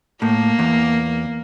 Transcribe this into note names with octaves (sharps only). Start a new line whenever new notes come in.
A2 A#3
E2